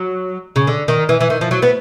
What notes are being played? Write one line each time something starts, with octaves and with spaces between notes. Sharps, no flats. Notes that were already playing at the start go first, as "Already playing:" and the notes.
Already playing: F#3
C#3
D3
D#3
E3
E3
D#3
F3
F#3
B3